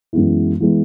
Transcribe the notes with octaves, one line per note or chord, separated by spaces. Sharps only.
F#2 E3 G#3 B3 E4
E3 G#3 B3 E4